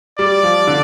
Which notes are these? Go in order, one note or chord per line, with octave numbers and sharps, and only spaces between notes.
G3 D5
F3
D3